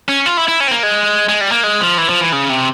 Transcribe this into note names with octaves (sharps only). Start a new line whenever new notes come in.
C#4
F4
E4
E4
C#4
C4
A#3
G#3
G#3
G3
A#3
G#3
F3
E3
F3
E3
C#3
C3